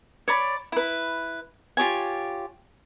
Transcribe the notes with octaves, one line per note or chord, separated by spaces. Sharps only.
C#5 D5 B5
E4 B4
F4 G4 C#5 G#5